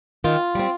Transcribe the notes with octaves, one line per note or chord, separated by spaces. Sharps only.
D#3 F4
G3 C4